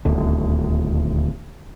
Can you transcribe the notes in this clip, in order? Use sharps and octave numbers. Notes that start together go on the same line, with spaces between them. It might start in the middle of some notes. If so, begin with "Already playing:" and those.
D#1 D2 D3